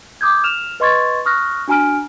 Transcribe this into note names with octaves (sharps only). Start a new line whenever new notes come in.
D6 D#6 G6 G#6
F6 E7 F7
B4 D#5 C6 C#6 G#6 A6
C#6 D#6 F6 F#6 A#6
D4 F#4 G#5 A#5 F6 D7